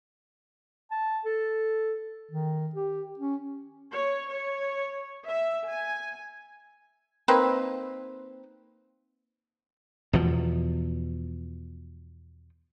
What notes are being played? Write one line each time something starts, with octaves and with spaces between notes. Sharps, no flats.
A5
A4
D#3
G4
C#4
C#5
C#5
E5
G#5
A#3 C4 D#4 B4
E2 B2 F3